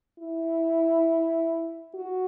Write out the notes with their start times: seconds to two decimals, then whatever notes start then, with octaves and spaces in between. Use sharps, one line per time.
0.19 E4
1.94 F#4